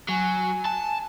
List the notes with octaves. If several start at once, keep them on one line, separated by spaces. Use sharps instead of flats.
F#3 G#5
A5